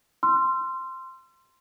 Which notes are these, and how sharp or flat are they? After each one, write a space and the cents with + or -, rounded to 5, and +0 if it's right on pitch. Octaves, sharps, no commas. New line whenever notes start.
C6 +0 E6 +45